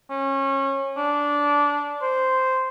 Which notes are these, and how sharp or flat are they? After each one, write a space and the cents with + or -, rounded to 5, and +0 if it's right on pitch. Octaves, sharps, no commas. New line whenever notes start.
C#4 -25
D4 -15
C5 -10